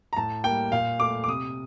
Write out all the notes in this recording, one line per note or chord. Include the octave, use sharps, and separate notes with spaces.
A#5
A2 A5
G3 A#3 G5
A#2 F5
A3 D6
D6
C3 D#6